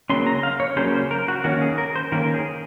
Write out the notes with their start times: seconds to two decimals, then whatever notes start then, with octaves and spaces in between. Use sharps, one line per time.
0.10 C#3 F#3 A#3 C#4 C6
0.27 A#5
0.43 F5
0.60 C#5
0.76 C#3 F#3 A#3 C#4 C5
0.94 C5
1.11 A#4
1.28 F#4
1.44 D#3 A#3 C#4 F#4
1.62 G#4
1.78 A#4
1.96 C5
2.12 D#3 A#3 C#4 A#4
2.34 G#4